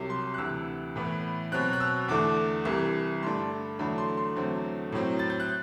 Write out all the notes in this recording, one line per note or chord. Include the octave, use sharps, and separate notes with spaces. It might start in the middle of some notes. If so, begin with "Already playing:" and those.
Already playing: C2 C3 F#3
C6
F#6
D2 C3 E3 E6
A2 E3 B3
B2 F#3 C4 F#6
F#6
E6
E2 D3 A3 D4 D6
C2 C3 E3
G2 D3 A3 D4 C6
E2 D3 F#3 A3 D4 B5
C6
C6
E2 D3 F#3 A3 C4
A2 F#3 C4
A6
G6
F#6